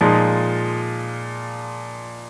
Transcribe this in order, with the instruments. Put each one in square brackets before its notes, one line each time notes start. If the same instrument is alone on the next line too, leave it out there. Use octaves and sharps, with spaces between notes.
[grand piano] A#2 F3 G#3 D#4